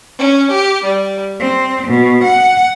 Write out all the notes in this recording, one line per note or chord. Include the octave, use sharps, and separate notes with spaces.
C#4
G4
G3
C4
B2
F#5